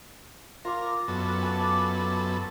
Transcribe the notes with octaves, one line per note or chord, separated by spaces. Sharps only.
F4 A#4 D6
F#2 B3 A4
G#5 A5 D6